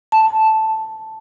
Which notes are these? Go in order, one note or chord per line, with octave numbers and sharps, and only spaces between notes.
A5